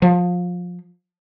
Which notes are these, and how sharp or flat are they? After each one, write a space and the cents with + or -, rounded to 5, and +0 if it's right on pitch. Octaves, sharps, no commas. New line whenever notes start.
F3 +25